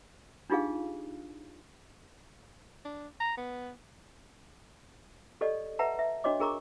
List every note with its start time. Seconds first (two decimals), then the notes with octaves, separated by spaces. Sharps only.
0.50 D4 D#4 F4 G4 G#4 F5
2.85 D4
3.20 A#5
3.37 B3
5.41 G4 A4 D5 D#5
5.79 B4 E5 F#5 A5 A#5
5.99 E5
6.24 D4 F#4 C#5 D#5 D6
6.39 D4 G#4 A#4 A#5 C#6 D6